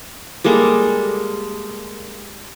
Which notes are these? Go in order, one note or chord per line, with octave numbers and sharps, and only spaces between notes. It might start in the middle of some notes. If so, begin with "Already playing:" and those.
G3 G#3 A#3 A4